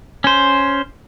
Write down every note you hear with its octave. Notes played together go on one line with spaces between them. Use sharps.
C#4 C5